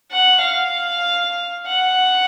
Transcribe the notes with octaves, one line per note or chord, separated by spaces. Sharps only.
F#5
F5
F#5